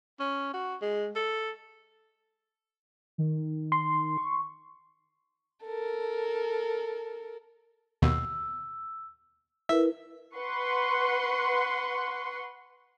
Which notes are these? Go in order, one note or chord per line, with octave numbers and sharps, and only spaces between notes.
C#4
F#4
G#3
A4
D#3
C6
C#6
A4 A#4
D#2 B2 E6
E4 A#4 B4 E5
B4 F#5 C6 C#6